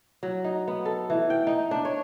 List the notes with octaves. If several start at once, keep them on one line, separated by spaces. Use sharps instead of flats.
F#3
D#4
B3
A4
E3
G5
D#4
D4
C#5